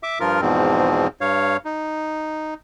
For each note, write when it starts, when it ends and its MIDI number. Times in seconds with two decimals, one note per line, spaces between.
0.03 0.19 76
0.03 0.19 86
0.20 0.41 43
0.20 0.41 53
0.20 0.41 65
0.20 0.41 70
0.41 1.07 40
0.41 1.07 44
0.41 1.07 47
0.41 1.07 53
0.41 1.07 60
1.21 1.57 43
1.21 1.57 73
1.21 1.57 77
1.65 2.54 63